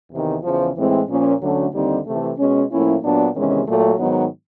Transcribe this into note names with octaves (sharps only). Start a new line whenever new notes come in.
E2 C3 D#3
E2 C#3 F3
A2 E3 G#3 C4
A#2 F3 A#3 C#4
D2 D3 F#3 A3 C#4
D#2 D3 G3 C4 D#4
C3 E3 A3
B2 G#3 C#4
A2 F3 A#3 C#4 E4
A#2 F#3 B3 D4
E2 C3 D#3 G#3 C#4
A#2 F#3 A3
G#2 D#3 F#3 B3 D#4